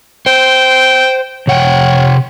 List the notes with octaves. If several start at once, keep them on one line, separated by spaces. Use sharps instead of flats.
C5 G5
C3 C#5 F#5 G5